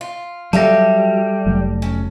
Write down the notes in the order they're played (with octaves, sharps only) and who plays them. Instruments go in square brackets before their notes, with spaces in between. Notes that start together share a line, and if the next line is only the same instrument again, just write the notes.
[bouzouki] F4
[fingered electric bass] F#3 [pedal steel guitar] G3 [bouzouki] A4 E5 F5 [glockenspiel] A5 A#6
[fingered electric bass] F1 F#3 A3
[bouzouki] C#4